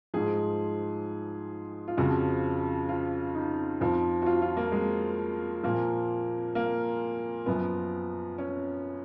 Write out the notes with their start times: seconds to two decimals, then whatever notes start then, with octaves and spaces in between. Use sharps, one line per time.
0.14 G#2 F3 G#4
1.88 F4
1.97 F2 C#3 F3 F#4
2.89 F4
3.35 D#4
3.81 F2 F3
4.22 F#4
4.26 F4
4.42 F4
4.57 A#3
4.72 G#3
5.63 A#2 F3 A#3
6.55 A#3
7.46 F#2 F3 B3
8.38 C#4